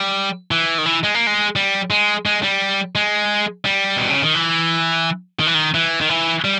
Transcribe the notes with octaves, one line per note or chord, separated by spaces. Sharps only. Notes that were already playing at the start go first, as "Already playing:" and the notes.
Already playing: G3
E3
D#3
E3
G#3
A#3
G#3
G3
G#3
G#3
G3
G#3
G3
B2
C#3
D#3
E3
D#3
E3
D#3
E3
D#3
E3
G3